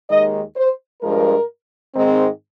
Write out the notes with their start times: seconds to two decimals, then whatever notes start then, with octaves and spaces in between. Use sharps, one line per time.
0.10 D#2 D#3 G#3 D#5
0.56 C5
1.02 G2 F3 G#3 A#4
1.95 G#2 D#3 G#3 C4